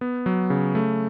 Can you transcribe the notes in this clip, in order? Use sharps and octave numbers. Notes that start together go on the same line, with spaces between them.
B3
F#3
C#3
A3